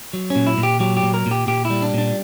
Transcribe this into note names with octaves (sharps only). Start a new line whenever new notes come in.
F#3
C#4
A#2
E4
A#2
G4
F#3 G4
G4
A#2
A#4
A#2
G4
A#2 G4
E4
G3
D4
A#2 D4